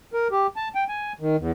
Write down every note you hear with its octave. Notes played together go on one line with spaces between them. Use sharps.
A#4
G4
A5
G5
G#5
D#3
E2